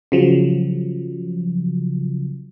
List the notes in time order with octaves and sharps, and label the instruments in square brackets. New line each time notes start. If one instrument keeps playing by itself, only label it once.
[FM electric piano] C#3 F3 F#3